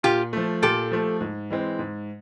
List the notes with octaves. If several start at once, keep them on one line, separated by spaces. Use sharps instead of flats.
A#2 F4 G4
F3 A3
A#2 G4 A4
F3 A3
G#2
E3 G#3 C4
G#2